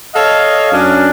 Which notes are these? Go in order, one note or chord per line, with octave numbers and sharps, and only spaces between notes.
A4 C#5 D#5 F5
F#2 C#4 D4